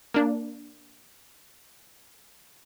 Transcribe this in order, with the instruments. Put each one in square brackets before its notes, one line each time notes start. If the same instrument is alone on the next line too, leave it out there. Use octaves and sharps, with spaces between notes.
[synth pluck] A#3 D4